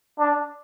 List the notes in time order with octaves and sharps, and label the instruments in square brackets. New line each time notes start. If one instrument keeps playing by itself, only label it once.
[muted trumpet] D4